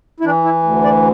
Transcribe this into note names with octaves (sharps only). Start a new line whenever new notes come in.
E4
E3 D4
E4
D2
D5